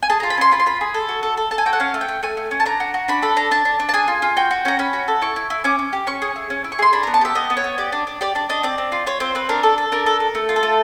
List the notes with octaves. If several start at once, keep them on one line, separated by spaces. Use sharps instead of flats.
G#5
G#4 A5
F4 A#5
B5
C#4 C6
F4 B5
C6
F4 B5
G#4
A4
F#4
A4
A4
A4 A5
G#5
F#4 G5
F#5
C#4 F5
A3
G5
A3
A3 G#5
A3
C#4
A5
D4 A#5
F#4
F#4
D4 B5
A4 B5
D4 A#5
D4 A5
D4
D4
A5
G#4 G#5
F4
F4
F#4 G5
F#4
C#4 A#5
C#4 B5
F#4
A4
E4 C#6
E4
E4
C#4 D6
C#4
G4
C#4 C#6
G#4
E4
C#4
E4
C#6
G#4 C6
D4 B5
B3 A#5
A5
G4 E5
B3 D#5
B3
C#5
B3
G4 D5
D4
D4
G4 D5
D4 D5
D4 D#5
C4 D5
C4
F4
F4 C#5
C4 C5
C4 B4
D4 A#4
A4
A4
D4 A#4
A4
A4
A3
F4
A4
A3